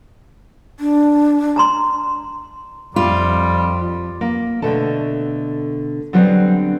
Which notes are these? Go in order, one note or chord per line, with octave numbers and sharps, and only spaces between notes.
D4
A5 A#5 C6
F2 G3 F4
A#3
B2 D3 A3 A4 A5
D3 F#3 G3 B3 C4 D4